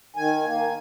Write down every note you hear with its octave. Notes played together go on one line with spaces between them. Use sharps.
D#3 G#5
A#3